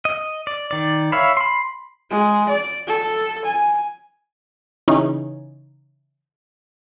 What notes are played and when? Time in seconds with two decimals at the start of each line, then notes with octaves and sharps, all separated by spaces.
0.05 D#5
0.47 D5
0.71 D#3 D5
1.12 C#5 E5 F5 B5
1.37 B5 C6
2.11 G#3
2.49 D5
2.88 A4
3.45 G#5
4.88 C#3 E3 C#4 D#4 C#5